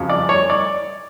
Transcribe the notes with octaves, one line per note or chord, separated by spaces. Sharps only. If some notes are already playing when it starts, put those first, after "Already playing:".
Already playing: F2 C#3 F#3
D5
C#5
D5